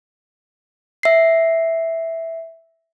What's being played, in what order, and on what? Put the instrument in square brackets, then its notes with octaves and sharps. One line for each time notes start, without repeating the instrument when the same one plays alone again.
[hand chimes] E5 C7